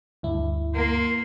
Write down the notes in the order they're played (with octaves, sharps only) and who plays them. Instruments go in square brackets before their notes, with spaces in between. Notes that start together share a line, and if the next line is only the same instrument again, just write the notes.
[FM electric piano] D2 G2 E4
[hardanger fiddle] A#3 [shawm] C6